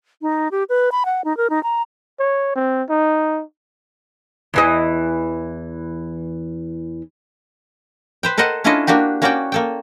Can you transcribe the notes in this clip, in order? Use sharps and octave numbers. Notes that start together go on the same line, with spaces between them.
D#4
G4
B4
B5
F#5
D#4
A#4
D#4
A#5
C#5
C4
D#4
E2 E3 D#5
B4 C5 G5
A4 A#4 C5 D#5 F#5
C#4 D4 E4 F4 A4 D#5
A#3 D4 F#4 G4
A#3 C#4 F#4 D5 F#5 G5
A#3 A4 G5